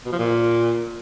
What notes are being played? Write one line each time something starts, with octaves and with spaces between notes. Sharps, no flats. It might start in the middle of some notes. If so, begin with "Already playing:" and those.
B2
F3
A#2